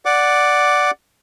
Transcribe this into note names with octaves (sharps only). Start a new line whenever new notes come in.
D5 F#5 D6